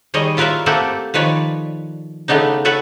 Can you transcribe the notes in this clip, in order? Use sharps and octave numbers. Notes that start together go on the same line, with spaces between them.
D#3 G3 G#4 C#5 D#5
E4 F4 A#4 B4 C#5 E5
A3 A#3 C4 G4 A4 F#5
D#3 F3 B4 C#5 D5
C#3 A3 B3 D4 D#4
A4 B4 C#5 E5 F#5